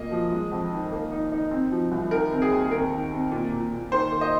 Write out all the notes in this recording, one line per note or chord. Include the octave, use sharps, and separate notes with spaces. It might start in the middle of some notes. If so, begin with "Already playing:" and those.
Already playing: A#2 A#3 D#5
F3
G#3
F2
D#3
A#3
D#4
D#4
C4
F3
C2
D#3 A#4
C4
G#4
D#2
C4 A#4
D#3
C4
A#2
A#2
A#2
D#3 C5
A#3
D#5